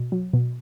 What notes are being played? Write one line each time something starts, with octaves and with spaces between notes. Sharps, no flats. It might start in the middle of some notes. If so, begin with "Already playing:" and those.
Already playing: B2
F#3
B2